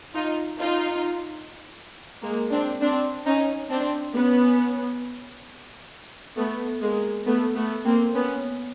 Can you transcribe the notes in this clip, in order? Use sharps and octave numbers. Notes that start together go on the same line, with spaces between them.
D#4 F4
D#4 F4
G#3 A#3
C4 D4
C4 D4
C#4 D#4
C4 D4
B3 C#4
A3 B3
G#3 A#3
A3 B3
A3 B3
A#3 C4
B3 C#4